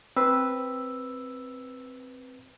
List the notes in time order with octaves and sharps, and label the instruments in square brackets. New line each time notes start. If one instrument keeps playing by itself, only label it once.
[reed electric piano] C4 B4 C5 [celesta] E6